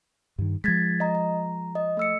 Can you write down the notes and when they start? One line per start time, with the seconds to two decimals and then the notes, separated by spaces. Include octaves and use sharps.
0.38 G2 D#3
0.64 F3 G#3 G#6 A6 B6
1.00 D#5 A#5
1.15 A#5
1.75 D#5
1.97 A3 E6 C#7